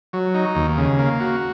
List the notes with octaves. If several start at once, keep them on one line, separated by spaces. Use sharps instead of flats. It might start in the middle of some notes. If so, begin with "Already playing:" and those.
F#3
D#4
D#2
C#3
A#3
F#4